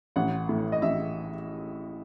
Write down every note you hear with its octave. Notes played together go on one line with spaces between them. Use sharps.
A1 F#5
A2
D#5
A1 E5